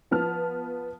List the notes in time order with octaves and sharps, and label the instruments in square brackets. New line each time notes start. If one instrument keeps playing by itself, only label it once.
[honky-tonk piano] F3 B3 A5 F6